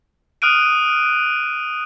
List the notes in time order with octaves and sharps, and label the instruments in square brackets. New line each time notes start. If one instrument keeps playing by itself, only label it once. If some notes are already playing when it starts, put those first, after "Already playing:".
[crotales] D#6 F6 F#6 D7 D#7